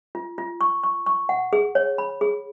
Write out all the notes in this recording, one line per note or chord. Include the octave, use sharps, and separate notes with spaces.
F4
F4
C#6
C#6
C#6
F#5
G#4
C#5
B5
G#4